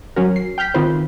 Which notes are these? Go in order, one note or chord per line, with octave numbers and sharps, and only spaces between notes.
F#3 C#4 F#4 A#4
C7
G5 F6 G6 B6
D#3 C4 D#4 F4 B4 C5